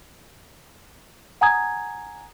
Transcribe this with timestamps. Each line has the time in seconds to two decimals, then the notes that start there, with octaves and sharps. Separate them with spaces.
1.41 F#5 G#5 A#5 D#6 G#6